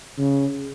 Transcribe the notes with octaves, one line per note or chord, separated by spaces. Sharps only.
C#3